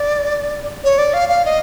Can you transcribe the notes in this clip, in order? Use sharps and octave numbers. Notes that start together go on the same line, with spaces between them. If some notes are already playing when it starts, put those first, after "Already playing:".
Already playing: D5
C#5
D5
F5
F5
D#5